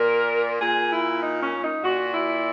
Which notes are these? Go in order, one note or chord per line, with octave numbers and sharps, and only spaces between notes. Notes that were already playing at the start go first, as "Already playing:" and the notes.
Already playing: A#2 A#4
A#2 G#4
E4
D#4
C#4
D#4
A#2 F#4
E4